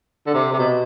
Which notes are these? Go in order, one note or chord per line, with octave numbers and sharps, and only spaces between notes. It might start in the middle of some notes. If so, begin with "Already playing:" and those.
D3
C3
C3
B2